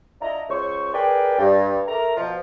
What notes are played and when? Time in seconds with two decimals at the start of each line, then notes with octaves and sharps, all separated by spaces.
0.21 D4 E4 F4 D#5 A#5
0.49 C#2 C5 C#5 C#6
0.94 G#4 A#4 B4 D5 G5
1.38 G2
1.88 A3 A#4 A#5
2.17 B2 F3